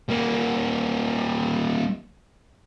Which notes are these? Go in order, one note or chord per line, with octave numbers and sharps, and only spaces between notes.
G3 A#3